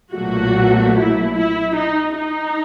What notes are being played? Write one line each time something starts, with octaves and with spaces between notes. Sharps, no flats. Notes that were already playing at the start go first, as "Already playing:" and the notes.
B1 A#2 F#3 A3 F#4
E4
E4
D#4
D#4